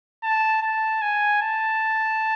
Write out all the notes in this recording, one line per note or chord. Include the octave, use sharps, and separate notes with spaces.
A5
A5
G#5
A5